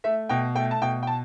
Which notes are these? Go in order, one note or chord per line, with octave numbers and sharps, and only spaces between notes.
A3 E5
B2 G5
A3 G5
A5
B2 G5
G5
A5